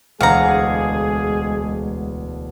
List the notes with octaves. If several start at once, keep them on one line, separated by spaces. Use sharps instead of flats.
E1 D2 G#3 G#4 F5 F#5 A#5